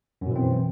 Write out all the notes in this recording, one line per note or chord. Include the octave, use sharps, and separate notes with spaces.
F#2 B2 E3 C4